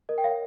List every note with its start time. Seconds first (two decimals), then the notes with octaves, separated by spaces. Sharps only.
0.09 A#4 D#5
0.18 G5
0.24 C#5 F5